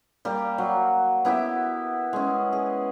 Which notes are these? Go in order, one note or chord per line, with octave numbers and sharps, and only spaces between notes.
G3 A#3 G4
F#3
B3 E4 G4 E5
G#3 C#4
G#4